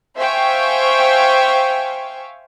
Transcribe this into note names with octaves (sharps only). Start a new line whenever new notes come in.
C5 E5 F5 G5 G#5 C#6